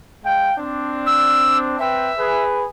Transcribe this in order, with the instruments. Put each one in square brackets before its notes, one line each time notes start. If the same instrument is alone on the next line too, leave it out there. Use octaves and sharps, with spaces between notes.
[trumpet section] G#3 F5 G5
C4 D4
[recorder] E6
[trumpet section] C4 B4 G5 [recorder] E5
[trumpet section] G#4 B4